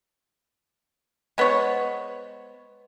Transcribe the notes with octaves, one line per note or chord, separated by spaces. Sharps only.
G#3 B3 C5 C#5